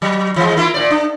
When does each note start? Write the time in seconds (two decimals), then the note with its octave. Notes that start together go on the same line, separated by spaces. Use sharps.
0.02 F#3
0.36 E3 G#3
0.56 A#3 E4 F4
0.74 A#2 C5 D5
0.90 D4